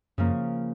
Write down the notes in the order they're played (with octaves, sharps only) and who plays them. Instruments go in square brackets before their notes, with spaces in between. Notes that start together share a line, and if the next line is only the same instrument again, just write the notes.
[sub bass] F#2 [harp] C#3 F3 A#3